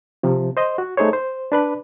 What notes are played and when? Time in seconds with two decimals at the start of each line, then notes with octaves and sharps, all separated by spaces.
0.23 C3 F3
0.57 C5 D#5 C6
0.78 F#4
0.97 A3 D#4 G#4 C5 C#5
1.13 C5
1.52 D4 B4 B5